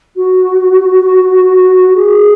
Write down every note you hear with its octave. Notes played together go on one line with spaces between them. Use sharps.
F#4
G#4